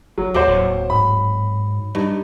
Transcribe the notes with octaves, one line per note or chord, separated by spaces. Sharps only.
F#1 F#3
D#2 F#3 C5 D6
D1
G#2 B5
G2 D#4